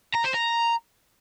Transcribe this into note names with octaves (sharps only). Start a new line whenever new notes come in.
A#5
C5
A#5